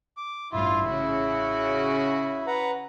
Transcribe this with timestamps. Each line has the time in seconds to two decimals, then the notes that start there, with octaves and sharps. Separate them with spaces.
0.17 D6
0.52 A1 G2 E4 F4
0.89 C#3 F#4
2.47 B4 F#5 A#5